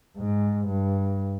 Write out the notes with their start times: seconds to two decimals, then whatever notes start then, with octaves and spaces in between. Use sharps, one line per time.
0.18 G#2
0.67 G2